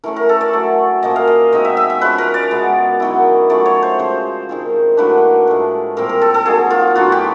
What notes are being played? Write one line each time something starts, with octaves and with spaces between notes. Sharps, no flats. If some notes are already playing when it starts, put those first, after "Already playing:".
E3 A3 C#4 A#4
A#4
A4
D5
F#3 A3 C#4
A#2 F3 A#3 C#4 D#5
F5
D#5
B2 G#3 C4 D#4 D#5
E5
E5
E5
F3 G#3 C#4 F4 B4
A#4
D5
B2 G#3 B3
D#3 F#3 B3 E4
F#3 A3 C#4 F4 D5
C#5
C5
C#3 F3 G#3 C5
D#3 G#3 C4 F4
A2 F#3 A#3 D4 B4
A2 F3 G#3
A#2 G3 C4 A#4
A#4
A4
A4
F#3 A#3 D#4 G#4
F4
A2 F#3 B3 D4 F#4
G4